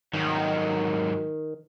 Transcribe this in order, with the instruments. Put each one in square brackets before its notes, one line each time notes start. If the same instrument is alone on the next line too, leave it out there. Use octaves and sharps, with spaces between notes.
[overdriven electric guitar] G#2 F#3 [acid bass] D#3